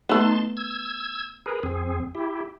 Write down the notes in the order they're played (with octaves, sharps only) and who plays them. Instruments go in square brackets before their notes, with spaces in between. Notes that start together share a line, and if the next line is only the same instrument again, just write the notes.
[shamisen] A3 B3 [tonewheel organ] D#4 A5 C6
[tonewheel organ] E6 G#6
G#4 A#4 B4
F2 C4 G#4
E4 G4